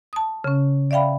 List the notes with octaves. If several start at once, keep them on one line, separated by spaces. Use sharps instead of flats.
A5 D#6
C#3 C#4
D5 E5 F5 G5 B5